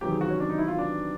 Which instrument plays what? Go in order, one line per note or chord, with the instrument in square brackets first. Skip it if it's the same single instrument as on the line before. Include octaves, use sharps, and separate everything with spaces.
[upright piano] E2 C3 D#3 F#3 G4
G#4
F#4
C#4
D4
D#4
E4
F4
D4